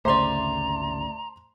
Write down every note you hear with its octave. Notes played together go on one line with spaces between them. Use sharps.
G#1 D2 C#3 A3 C5 D5 A#5 C6